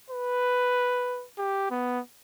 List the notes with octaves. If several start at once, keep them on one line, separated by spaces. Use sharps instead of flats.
B4
G4
B3